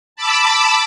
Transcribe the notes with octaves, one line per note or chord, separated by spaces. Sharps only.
A5 B5 D6 E6